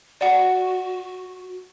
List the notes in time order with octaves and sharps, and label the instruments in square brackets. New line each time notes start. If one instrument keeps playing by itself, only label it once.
[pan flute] F#4 [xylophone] D5 F#5